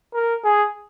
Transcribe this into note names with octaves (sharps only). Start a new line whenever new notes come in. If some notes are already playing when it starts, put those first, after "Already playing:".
A#4
G#4